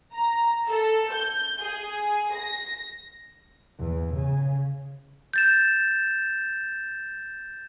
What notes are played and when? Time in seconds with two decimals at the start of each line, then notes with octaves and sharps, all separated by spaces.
0.14 A#5
0.68 A4
1.12 G6
1.61 G#4
2.35 A#6
3.79 E2
4.14 C#3
5.34 G6 A6 E7